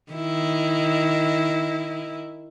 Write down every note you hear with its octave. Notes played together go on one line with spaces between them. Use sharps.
D#3 E4